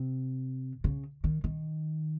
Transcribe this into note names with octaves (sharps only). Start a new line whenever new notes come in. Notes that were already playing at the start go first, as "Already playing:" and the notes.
Already playing: C3
C#3
D#3
D#3